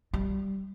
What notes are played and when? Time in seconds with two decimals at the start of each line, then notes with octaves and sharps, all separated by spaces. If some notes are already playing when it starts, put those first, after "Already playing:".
0.14 G3